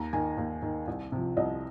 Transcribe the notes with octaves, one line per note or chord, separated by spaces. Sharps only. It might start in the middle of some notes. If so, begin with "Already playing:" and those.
Already playing: D#2 A#5
D#3 G#5
D#2
D#3
C2
C3 F3
C2 D#5